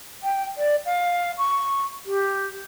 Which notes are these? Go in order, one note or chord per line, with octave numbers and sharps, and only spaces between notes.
G5
D5
F5
C#6
G4